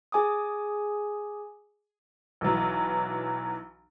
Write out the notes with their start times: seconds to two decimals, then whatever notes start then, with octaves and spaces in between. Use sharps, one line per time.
0.12 G#4 G#5 D6 D#6
2.41 B1 E3 F#3